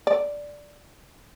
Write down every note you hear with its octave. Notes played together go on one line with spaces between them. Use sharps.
D5